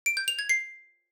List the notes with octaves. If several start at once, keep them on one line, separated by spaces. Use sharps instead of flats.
D7
G6
F7
G#6
C7